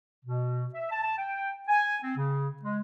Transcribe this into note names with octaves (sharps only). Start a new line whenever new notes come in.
B2
E5
A5
A5
G5
G#5
C4
C#3
G#3